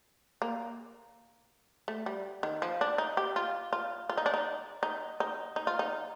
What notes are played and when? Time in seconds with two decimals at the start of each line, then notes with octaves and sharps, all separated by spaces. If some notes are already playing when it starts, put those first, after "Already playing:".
0.42 A#3
1.88 A3
2.06 G3
2.43 D#3
2.62 F3
2.81 D4
2.98 D#4
3.17 G4
3.36 F4
3.73 F4
4.09 F4
4.17 D#4
4.26 D4
4.34 D#4
4.83 D#4
5.20 D#4
5.56 D#4
5.67 F4
5.79 D#4